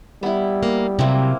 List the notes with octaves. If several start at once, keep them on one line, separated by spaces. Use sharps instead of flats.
G3 B3 E4
A#3
C3 F#3 A#3 C4 E4